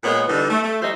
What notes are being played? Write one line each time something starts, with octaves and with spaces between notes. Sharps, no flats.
A#2 G#3 B3 A#4 C#5
D3 E3 G3 D#4
A3
A3
F3 G3 D#4 C5 E5